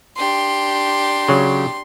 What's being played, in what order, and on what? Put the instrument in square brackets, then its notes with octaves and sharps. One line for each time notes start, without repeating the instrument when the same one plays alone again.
[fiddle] D4 G4 [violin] C6
[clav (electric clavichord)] C#3 F#3